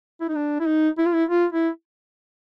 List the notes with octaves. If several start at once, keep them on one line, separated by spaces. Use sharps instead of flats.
E4
D#4
D4
E4
D#4
E4
F4
E4
F4
E4